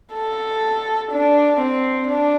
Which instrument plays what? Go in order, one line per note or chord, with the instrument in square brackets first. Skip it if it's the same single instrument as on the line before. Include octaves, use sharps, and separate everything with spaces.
[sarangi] A4
D4
C4
D4